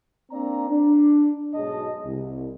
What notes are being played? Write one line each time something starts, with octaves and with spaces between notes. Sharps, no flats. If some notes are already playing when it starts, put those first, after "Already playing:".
A#3 C4 D4 D5 A#5
D4
B1 G#2 F#3 G#3 D#5 A5
C2